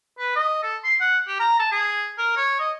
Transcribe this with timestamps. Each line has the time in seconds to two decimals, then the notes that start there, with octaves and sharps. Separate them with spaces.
0.19 B4
0.36 D#5
0.63 A4
0.84 C6
1.00 F#5
1.28 G4
1.40 A#5
1.59 A5
1.72 G#4
2.18 A#4
2.37 C#5
2.59 D#5